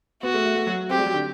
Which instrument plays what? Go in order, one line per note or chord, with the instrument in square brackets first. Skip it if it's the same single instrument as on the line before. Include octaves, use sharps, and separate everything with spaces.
[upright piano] B3 [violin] F#4
[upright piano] A3
A3
A3
F#3
[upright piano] C4 [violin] G4
[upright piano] G3
F#3
D3